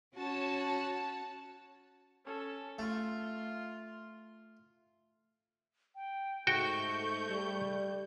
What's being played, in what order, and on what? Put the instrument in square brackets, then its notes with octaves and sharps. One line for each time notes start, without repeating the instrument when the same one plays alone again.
[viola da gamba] C#4 F#4 [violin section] C#5 A5
[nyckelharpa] C#4 A4
[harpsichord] A3 [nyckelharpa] F4 C6
[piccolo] G5
[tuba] G#2 [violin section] A3 G6 [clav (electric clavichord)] F#4 G5 [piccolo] C#6
[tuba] G3